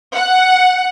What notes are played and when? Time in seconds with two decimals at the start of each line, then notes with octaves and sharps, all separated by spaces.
0.14 F#5